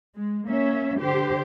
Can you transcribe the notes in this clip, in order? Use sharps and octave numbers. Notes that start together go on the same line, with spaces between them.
G#3
A#3 C#4 E5
D3 G4 C5